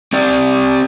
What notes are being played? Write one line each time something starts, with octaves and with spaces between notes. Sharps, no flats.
C4 G4 D5